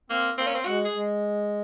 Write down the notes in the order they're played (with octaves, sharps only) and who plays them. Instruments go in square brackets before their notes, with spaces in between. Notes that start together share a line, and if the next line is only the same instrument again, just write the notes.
[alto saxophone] A#3 [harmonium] C4
[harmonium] A#3 [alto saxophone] C4
[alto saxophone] C#4
C4
[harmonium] G#3 [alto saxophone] F#4
[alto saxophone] G#4
[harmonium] G#3